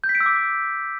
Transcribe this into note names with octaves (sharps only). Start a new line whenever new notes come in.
G6
B6
D7
E6
D6